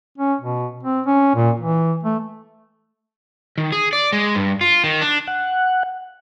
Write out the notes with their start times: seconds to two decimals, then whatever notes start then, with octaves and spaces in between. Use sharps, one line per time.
0.18 C#4
0.41 B2
0.83 C4
1.06 C#4
1.35 A#2
1.60 E3
2.03 A3
3.58 D#3
3.72 G#4
3.93 D5
4.13 G#3
4.35 G2
4.61 F4
4.84 D#3
5.02 D4
5.28 F#5